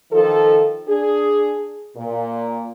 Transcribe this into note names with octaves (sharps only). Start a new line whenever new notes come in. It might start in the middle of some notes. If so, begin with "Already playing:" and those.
D#3 F3 A4
D4 G#4
A#2